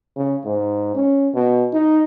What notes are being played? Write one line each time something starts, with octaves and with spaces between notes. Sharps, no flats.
C#3
G#2
C#4
B2
D#4